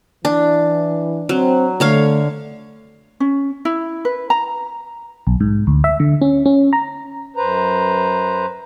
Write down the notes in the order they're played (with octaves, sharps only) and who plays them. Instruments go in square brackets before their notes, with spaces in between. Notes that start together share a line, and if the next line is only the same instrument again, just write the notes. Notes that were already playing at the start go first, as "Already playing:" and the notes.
[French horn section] E3 [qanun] D4
[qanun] F#3 [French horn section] C4
[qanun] D3 C#5 F5 [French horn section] A3
[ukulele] C#4
E4
B4
A#5
[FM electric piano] B1
G#2
D2
E5
D3
C#4
C#4
A#5
[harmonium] F#2 B4 C5 A#5